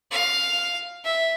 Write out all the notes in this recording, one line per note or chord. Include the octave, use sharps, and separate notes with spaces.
F5
E5